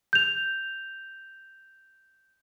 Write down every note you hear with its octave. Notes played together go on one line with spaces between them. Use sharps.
G6 F7